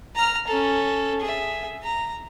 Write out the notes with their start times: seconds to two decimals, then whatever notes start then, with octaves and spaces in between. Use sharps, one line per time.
0.16 A#5 F6
0.47 C#4 A4
1.21 G#4 E5
1.83 A#5